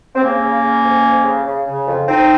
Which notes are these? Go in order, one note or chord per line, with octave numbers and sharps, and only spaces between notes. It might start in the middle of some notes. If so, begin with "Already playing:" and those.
C4
C#3 A#3 C#4
C#3
C#3
F2
F2
C#3
C#3
C#3
F2
F2 C4 D#4